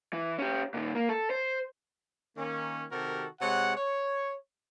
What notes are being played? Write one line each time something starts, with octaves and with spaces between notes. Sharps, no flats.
E3
C#4 G4
A#2 D#3
A#3
A4
C5
D#3 A#3 C#4
C3 D#3 F#4 G4 A4 A#4
C3 G#3 C#5 F#5
C#5